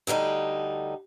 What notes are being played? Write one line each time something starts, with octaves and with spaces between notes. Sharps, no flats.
D2 D3 G3 D#4